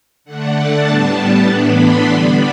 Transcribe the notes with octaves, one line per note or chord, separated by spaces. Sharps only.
D3 A3 D4 F#5
A5
A2 G3 B3 D4
A2 E3 B3 D4 B5
C6
D3 G3 B3 D4 B5